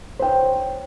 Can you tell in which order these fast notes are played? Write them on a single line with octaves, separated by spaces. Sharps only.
C5 G5 C#5